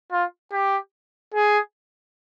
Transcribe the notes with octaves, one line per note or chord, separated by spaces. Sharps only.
F4
G4
G#4